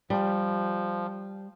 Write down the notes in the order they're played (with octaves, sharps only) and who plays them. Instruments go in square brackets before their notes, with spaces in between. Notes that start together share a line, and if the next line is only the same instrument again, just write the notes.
[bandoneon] F3 [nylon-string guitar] G3